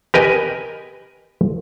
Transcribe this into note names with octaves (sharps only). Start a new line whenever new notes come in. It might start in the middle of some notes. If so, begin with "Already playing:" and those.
G4 A#4 B4 D#5 G#5